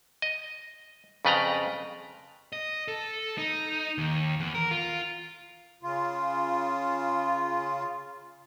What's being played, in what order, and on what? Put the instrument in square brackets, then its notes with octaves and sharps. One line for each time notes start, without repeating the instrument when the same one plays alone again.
[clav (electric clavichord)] D#5
F2 C#3 B4 D5 G5 A#5
[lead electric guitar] D#5
A4
D#4
D#2
E2
A#4
F4
[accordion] C#3 F4